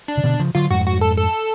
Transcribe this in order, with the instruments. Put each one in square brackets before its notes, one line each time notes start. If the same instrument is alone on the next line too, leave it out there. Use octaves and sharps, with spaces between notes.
[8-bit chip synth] D4
[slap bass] C#3
B2 D3
C#3 F3
[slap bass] D3 F#3 [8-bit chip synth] F4
[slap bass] F2 G#2 [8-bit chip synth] F#4
[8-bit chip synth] F#4
A4
A4